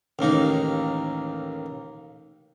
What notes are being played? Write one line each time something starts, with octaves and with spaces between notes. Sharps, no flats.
A1 D#2 A#3 D#4